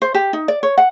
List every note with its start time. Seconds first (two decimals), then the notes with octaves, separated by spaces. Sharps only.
0.02 C5
0.14 G4
0.33 D#4
0.48 D5
0.63 C#5
0.78 F#5